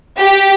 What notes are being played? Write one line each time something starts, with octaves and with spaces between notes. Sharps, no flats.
G4